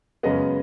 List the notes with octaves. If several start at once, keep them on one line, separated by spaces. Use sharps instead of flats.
F#2 C#3 G#3 B3 D#5